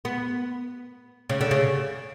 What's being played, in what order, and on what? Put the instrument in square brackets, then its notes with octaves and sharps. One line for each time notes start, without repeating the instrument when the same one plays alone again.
[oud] B3
C#3
D3
C#3